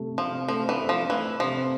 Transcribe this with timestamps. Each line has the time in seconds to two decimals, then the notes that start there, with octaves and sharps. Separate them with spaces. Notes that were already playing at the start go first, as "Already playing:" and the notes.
Already playing: C3 A3
0.18 C3 F3
0.48 F3 A3
0.69 E3
0.80 A3
0.89 F3
1.09 E3 A3
1.40 C3 F3